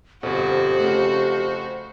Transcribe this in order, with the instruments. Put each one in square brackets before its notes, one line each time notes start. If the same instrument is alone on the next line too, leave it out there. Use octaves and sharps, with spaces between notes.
[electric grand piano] G1 B2 [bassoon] F2 [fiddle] F#4 C5 [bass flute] G4
[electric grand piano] C#3 A3